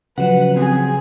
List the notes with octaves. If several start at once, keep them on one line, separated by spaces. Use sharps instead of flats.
C#3 F3 F#3 B4 F#5
C4 G#4